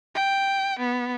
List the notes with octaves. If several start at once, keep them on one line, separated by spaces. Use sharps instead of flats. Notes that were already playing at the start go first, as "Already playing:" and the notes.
G5
B3